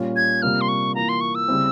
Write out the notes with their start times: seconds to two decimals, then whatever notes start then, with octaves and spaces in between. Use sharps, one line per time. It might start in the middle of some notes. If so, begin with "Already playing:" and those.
Already playing: A#2 G3 C#4 F4
0.16 G#6
0.42 C3 G3 A#3 F4 F6
0.61 C6
0.68 C#6
0.95 E3 A#3 F4 A#5
1.09 C6
1.21 C#6
1.35 E6
1.48 C#3 G3 C4 E4